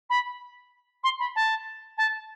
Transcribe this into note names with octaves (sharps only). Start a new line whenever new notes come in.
B5
C6
B5
A5
A5